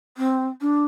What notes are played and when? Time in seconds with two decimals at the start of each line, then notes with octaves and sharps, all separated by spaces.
0.18 C4
0.61 D4